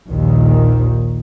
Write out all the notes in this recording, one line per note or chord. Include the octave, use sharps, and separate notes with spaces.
A#1 D#2 A#2 D#3